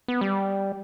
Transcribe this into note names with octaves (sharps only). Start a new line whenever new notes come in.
B3
G3